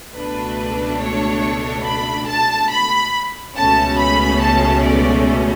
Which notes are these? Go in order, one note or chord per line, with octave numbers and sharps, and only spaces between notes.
C#2 B2 A3 D4 B4
C#5
B5
A5
B5
C#2 B2 A3 C#4 A5
B5
A5
D5